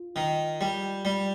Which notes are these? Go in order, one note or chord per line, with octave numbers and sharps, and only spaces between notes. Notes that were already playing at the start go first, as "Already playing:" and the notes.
Already playing: F4
D#3
G3
G3